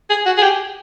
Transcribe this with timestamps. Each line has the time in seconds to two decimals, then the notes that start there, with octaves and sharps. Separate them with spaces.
0.10 G#4
0.26 F#4
0.38 G#4
0.43 G4